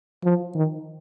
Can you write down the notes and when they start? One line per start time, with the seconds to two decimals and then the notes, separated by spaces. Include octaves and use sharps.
0.24 F3
0.55 D#3